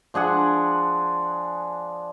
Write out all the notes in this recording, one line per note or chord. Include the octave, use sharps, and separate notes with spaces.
F3 D4 G#4 F#5